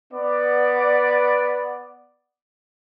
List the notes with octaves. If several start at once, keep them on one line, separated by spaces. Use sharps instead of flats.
B3 D5